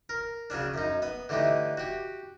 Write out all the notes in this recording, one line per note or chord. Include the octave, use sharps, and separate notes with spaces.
A#4
C#3 F#3 C#4 D4
F#2 D#4
B3 D#6
D3 E3 A3 D#4 G4
F#4 G4